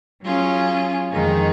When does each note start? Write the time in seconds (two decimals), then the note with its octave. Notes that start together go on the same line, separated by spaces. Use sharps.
0.22 F#3 C#4 F4 G#4
1.11 F2 D#3 G#3 D#4 G#4